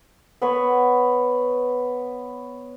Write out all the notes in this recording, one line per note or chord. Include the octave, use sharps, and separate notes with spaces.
B3 B4 C#5 C#6